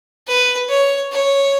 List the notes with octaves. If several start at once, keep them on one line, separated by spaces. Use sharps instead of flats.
B4
C#5
C#5